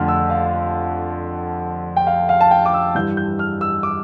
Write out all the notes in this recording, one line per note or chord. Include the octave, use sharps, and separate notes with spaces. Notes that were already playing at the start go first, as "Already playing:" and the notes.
Already playing: F2 D3 A3 F6
E6
F5
G5
F5
F5
A5
G5
D6
E6
G2 E3 G3 G6
G6
F6
E6
D6